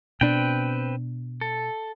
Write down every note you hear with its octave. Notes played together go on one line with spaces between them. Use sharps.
B2 C4 D4 B4 G5
A4